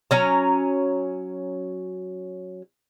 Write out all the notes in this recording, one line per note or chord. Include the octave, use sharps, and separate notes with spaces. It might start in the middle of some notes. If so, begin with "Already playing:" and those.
F#3 C#4 A#5